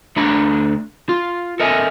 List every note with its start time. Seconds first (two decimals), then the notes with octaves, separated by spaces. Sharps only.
0.16 D2 D3 A3 D4 A#5 B5
1.09 F4
1.60 A4 A#4 D#5 E5 F#5 G#5